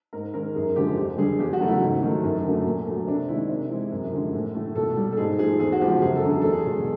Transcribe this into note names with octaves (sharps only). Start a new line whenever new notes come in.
G#2 A#4
D#3 G#3 A#4
F#2 G#4
D3 F3 G#3 G4
F2 G4
D3 G3 G#4
E2 G4
F#4
C#3 F#3 A3
E4
G#2
D#3 F#3 A3
F#2
D3 F#3 A3
A#2
F#3 A3
C3 D4
D#3 G#3 E4
C3
E3 G#3
F#2
D3 F3 G#3
A2
E3 A3
B2 A4
G3
A4
G#2 G#4
F3 A3 G#4
E2 G#4
F#4
C#3 F3 G#3 G4
F#2 G#4
A4
D3 F#3
G#4
E2 A4
G#4
B2 G#3